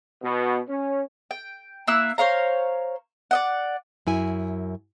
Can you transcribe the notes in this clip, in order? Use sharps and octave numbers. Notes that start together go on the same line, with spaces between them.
B2
C#4
G5
A#3 E4 E6 F#6
C5 C#5 F5 A#5
D5 D#5 F#5
F#2 E4 G#5